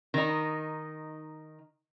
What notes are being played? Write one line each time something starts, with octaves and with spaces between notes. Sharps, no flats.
D#3 D#4